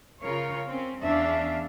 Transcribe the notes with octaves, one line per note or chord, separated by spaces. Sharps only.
C#3 F4 A#4 C#5
C4 C#4
E2 C#4 D4 E5 F5